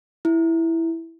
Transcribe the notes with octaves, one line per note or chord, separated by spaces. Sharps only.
E4